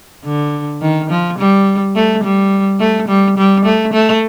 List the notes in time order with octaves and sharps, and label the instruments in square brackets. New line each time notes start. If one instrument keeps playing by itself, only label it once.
[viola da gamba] D3
D#3
F3
G3
A3
G3
A3
G3
G3
A3
A3